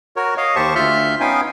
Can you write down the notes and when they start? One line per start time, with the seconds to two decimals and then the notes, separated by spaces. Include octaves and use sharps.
0.16 F#4 A#4 C#5
0.37 C#5 D#5 F5
0.56 D#2 G4 C5 A5 C#6
0.75 D2 F4 E5 F6 G6
1.20 B3 C#4 D#4 F5 G5 G#5